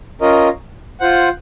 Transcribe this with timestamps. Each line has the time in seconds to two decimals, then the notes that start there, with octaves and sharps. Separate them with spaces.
0.21 C#4 F4 A#4 D#5
1.00 F4 C5 F#5